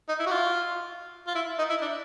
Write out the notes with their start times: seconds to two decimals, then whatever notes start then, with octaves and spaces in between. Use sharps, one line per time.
0.08 D#4
0.19 E4
0.26 F#4
0.31 F4
1.27 F4
1.35 E4
1.58 D#4
1.70 E4
1.81 D4